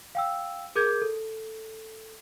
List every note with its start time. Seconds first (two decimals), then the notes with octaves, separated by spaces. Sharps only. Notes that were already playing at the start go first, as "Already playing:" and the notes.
0.15 F5 G5 E6
0.76 G#4 A#4 D6 G6 G#6
1.02 A4